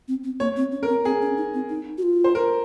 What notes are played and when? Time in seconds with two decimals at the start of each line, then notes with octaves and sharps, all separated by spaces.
0.08 C4
0.24 C4
0.40 A#3 C#5
0.57 C4
0.72 C#4
0.83 A#4
0.88 C4
1.05 C4 G#4
1.22 C#4
1.37 D#4
1.54 C4
1.70 D#4
1.98 F#4
2.03 F4
2.24 C5
2.35 A#4